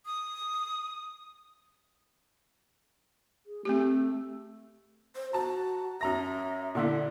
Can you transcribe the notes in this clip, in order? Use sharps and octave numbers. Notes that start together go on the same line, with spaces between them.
D#6
G#4
A3 C4 G4
C5
F#4 A5 A#5
F#2 E5 A#5 A#6
A#2 D3 E4 D5